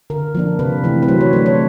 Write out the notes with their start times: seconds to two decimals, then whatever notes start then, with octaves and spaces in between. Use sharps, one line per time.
0.10 D3 A#4
0.35 F3 A#3 D4
0.59 C3 B4
0.84 E3 A3 C4
1.03 B4
1.08 F#3 C5
1.21 C#5
1.33 A3 D4 C5
1.46 C#5